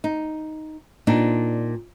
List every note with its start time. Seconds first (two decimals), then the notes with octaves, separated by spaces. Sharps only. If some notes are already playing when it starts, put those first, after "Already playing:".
0.04 D#4
1.07 A#2 C4 D4 D#4